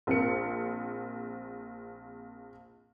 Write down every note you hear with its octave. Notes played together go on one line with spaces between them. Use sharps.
A#1 C4 A#4 C#7